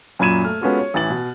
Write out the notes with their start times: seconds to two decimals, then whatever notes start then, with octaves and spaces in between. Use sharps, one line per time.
0.19 F#2 A#2 B5 G#6 D#7 E7
0.44 A3 F6
0.61 G#3 B3 C#4 F4 F#4 A4
0.79 C#5
0.94 A1 E3 A6 F#7
1.10 B2